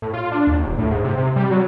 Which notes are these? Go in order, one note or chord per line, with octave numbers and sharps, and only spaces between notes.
A2
F4
D4
D#2
D#1
A2
G#2
C3
C3
G3
F#3